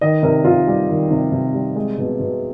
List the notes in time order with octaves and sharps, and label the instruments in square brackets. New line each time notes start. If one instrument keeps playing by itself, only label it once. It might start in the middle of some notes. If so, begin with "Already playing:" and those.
[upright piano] D#3 D#5
C3 A#4
C3 F4
G3
D#3
C3
C3
G3
G#3
B2
B2